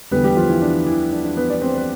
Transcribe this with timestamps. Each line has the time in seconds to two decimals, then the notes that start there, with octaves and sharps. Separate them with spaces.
0.11 E2 D3 G3 B3 B4
0.24 G3 G4
0.36 F3 F4
0.49 E3 E4
0.62 D4
0.86 E3 E4
1.12 D4
1.24 D4
1.37 B3 B4
1.49 D4 D5
1.62 C4 C5
1.78 B4